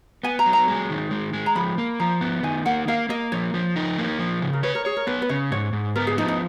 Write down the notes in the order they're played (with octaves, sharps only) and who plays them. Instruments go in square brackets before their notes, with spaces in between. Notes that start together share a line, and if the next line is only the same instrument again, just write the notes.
[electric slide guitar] B3 [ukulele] G#5
[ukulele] A#5
[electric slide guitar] F#3
[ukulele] A#5
[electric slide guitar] G#3
D#3
G#3
G#3
[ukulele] A#5
[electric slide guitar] F3 [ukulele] B5
[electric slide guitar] A#3
[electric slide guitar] F3 [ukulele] A#5
[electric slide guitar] B3
[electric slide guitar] D#3 [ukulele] G#5
[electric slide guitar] A#3 [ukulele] F#5
[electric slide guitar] A#3 [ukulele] F5
[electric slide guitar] A#3 [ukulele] D#5
[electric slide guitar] F3 [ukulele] C#5
[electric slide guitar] F3
D#4
A#3
F3
C#3
[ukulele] A#4
[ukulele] B4 [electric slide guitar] C#5
[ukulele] A#4
[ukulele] G#4 [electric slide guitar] C#5
[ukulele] A#4
[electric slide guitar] B3 [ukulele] B4
[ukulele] B4
[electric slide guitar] C#3 [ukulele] C#5
[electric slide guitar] G#2 [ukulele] C#5
[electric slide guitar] G#2
[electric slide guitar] B3 [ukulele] A#4
[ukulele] G#4
[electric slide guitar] F3 [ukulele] D#4
[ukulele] D#4